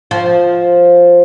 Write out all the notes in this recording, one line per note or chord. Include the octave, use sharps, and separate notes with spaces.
F3